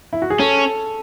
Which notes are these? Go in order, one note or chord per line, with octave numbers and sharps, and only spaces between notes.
E4
F#4
G#4
C#4 A4